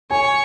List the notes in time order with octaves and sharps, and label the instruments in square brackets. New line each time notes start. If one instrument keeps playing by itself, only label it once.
[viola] C#5 [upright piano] G#5